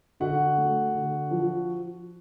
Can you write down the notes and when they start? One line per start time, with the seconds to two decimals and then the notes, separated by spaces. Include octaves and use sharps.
0.20 D3 F#4 F#5
0.58 A3
0.95 D3
1.31 F3